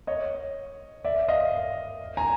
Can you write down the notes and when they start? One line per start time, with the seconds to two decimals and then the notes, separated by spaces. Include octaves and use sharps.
0.07 C#5 D#5
1.04 D5 E5
1.28 D#5 F5
2.17 G#5 A#5